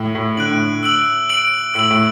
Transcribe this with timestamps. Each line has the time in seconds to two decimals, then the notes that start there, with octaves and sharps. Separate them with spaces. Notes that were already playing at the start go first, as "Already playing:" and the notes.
Already playing: A2
0.15 A2
0.37 D3 F#6 D7 F#7
0.52 A2
0.83 E6 D7 F#7
1.29 E6 D7 F#7
1.74 A2 E6 D7 F#7
1.91 A2